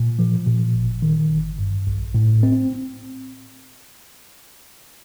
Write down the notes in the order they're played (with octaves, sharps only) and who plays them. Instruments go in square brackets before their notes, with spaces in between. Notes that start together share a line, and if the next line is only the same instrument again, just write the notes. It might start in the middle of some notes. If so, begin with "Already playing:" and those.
Already playing: [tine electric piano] A#2
F3
A#2
G1
D#3
G1
G2
A#1
A2
C4